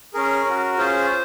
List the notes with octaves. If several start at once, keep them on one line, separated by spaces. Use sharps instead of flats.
C#4 G#4 A#4
C#4 F#4
C#4 F4 G#4 C5